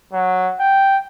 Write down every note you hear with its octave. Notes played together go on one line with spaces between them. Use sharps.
F#3
G5